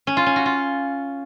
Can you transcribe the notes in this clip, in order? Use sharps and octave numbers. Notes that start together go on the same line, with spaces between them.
C#4
F4
C#4
F#4
F4